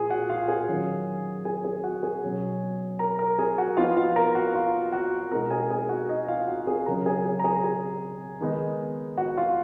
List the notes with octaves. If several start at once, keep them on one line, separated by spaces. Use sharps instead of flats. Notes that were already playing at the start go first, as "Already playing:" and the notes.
Already playing: A#2 F3 G#4 G#5
F#4 F#5
F4 F5
G#4 G#5
D#3 F#3 C#4
G#4 G#5
G#4 G#5
F#4 F#5
G#4 G#5
B2 F#3 C#4
A#4 A#5
A#4 A#5
G#4 G#5
F#4 F#5
F3 B3 D#4 F4 F5
F4 F5
A#4 A#5
F#4 F#5
F4 F5
F#4 F#5
B2 G#3 D#4 A#4 A#5
G#4 G#5
G#4 G#5
F#4 F#5
D#4 D#5
F4 F5
F#4 F#5
G#4 G#5
C#3 F#3 C#4 A#4 A#5
G#4 G#5
G#4 G#5
A#5
G#4 G#5
G#4 G#5
D#3 G#3 B3 D#4
F#4 F#5
F4 F5